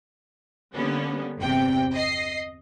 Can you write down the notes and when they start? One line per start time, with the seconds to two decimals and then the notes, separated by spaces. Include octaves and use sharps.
0.74 D3 G3 A#3 B3 C#4
1.38 G1 E2 C3 G5
1.94 D#5 C7